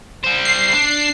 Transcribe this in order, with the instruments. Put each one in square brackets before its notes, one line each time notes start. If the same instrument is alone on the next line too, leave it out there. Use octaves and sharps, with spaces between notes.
[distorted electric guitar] G3 C5
[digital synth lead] C7
[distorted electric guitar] D4